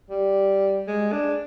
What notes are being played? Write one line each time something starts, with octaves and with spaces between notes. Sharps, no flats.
G3
G#3
D4